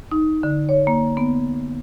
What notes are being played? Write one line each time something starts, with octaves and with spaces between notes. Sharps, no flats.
D#4
D3
C#5
A#3
B3